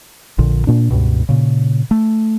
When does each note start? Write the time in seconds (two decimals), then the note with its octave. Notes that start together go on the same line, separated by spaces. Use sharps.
0.39 A#1 A#2 D3
0.67 A#2 D4
0.91 C#2 G2 B2
1.29 A#2 C#3
1.91 A3